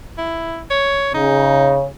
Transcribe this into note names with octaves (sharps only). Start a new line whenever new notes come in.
E4
C#5
C#3 D#4